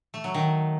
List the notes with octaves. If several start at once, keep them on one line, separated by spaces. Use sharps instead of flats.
A3
F#3
D#3